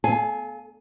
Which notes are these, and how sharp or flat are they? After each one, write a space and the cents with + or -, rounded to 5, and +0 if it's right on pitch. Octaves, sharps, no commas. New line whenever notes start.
A4 -40 F5 +0 G#5 +0